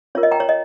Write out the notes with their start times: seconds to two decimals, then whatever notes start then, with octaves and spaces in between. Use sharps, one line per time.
0.15 C#4 F4 A#4 C#5
0.23 D#5
0.31 G5 A#5
0.40 C#5
0.49 D#5